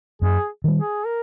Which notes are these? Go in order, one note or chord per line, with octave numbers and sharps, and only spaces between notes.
F#2 G#4
D#3 G3
G#4
A#4